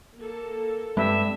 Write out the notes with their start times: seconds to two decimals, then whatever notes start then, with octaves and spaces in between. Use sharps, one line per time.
0.16 A#3 A4
0.97 G2 G#3 C4 E5